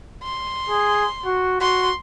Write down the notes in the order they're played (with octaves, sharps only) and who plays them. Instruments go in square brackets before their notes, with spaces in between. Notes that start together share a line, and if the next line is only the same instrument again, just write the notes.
[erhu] C6
[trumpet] G#4
F#4
[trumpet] F#4 [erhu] C6